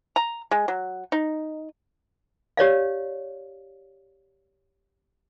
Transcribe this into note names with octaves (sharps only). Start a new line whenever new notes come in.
A#5
G#3
F#3
D#4
G4 C#5 D5 F5